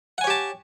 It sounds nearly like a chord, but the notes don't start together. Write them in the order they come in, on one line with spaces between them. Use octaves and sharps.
F#5 G#5 C#5 G4 A5